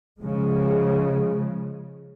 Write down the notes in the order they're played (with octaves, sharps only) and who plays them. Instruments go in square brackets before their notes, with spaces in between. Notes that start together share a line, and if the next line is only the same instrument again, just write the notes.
[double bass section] C#3 F3 G#3